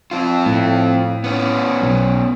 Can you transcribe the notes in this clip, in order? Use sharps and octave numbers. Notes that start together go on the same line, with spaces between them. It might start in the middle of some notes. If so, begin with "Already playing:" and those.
F3 C4 F4
A2
B3 C#4
B1